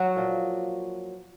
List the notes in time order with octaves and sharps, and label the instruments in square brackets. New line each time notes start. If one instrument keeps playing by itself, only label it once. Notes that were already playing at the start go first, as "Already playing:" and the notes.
Already playing: [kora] F#3 F#4
A#2 F3